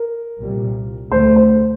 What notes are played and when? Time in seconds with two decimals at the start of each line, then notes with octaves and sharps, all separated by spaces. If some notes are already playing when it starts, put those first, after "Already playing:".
Already playing: A#4
0.39 C2 A#2 G3
1.11 D2 D3 A3 C5
1.36 C5